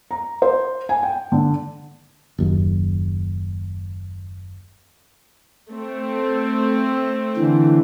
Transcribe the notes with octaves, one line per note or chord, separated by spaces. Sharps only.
A#5
C5
G#5
G5
D3
F#1 D#2
A3 C4
D3 E3